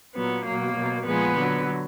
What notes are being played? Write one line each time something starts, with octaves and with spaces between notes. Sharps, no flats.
A#2 F#3 B3
B2 F#3 A#3
B2 F#3
A#2 F3 G#3 B3
D3 F#3